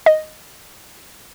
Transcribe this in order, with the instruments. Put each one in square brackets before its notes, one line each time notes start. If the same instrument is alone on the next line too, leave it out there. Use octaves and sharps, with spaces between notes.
[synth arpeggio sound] D#5